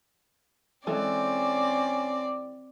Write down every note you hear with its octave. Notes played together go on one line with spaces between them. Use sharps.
E3 G#3 C4 C#4 A4 D5